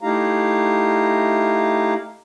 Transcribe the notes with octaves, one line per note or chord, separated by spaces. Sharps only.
A3 D#4 E4 G4 F5 A#5